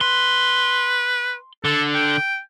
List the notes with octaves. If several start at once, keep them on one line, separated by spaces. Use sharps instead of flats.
B4 C6
D3 A4
G5